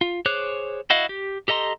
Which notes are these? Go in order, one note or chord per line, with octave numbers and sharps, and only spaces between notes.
F4
G#4 C5 C#5 D6 F#6
E4 F#4 D#5 F5
G4
G4 A4 D#5 A#5 C6